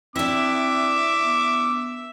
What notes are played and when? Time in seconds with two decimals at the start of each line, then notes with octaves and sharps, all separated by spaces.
0.16 C4 D4 E4 E5 D6
1.21 B3